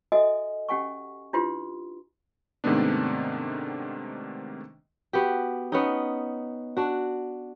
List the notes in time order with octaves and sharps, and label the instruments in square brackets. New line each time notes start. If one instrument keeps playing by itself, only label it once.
[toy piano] F#4 A4 D#5 E5 G#5 D#6
C#4 G4 F#5 G#5 C#6
D4 E4 F4 G4 B4 C6
[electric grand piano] G#2 C3 D#3 A3 B3 D4
[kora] B3 F#4 G4
B3 C#4 D#4
D4 F#4